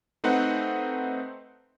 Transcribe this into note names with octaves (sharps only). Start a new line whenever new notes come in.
A3 C4 D#4 B4 F#5